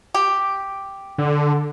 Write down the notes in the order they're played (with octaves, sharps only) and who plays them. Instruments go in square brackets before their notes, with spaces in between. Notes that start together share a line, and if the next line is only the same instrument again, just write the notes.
[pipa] G4
[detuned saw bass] D3